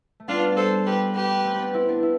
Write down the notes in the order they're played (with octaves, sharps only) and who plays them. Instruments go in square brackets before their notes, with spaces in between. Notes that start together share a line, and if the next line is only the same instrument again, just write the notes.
[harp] A3
[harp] G3 B3 [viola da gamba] D4 F4
[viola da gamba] A4 C5
G4 B4
G4 B4
[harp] A3 C4
B3 D4
C4 E4
B3 D4
E4